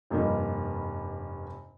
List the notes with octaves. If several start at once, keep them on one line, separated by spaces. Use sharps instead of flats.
F1 G2 A#3 D#4